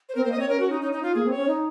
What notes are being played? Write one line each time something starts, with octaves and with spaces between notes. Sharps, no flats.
C5
C4 A#4
A#3 C5
D#5
C4 C#5
C#4 A#4
F#4
D#4
D#4
D#4
F4
A#3 G#4
C4
C#5
C#4
D#4